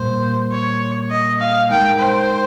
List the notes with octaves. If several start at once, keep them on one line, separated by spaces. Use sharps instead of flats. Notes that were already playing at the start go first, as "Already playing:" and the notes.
Already playing: A#2 G3 A#3 C5
C#5
D#5
F5
G#3 D#4 A#4 G5
C5